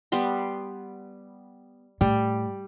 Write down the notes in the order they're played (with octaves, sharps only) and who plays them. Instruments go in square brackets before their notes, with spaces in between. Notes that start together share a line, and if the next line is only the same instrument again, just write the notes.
[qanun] G3 B3 C6
[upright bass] A2 [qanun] G3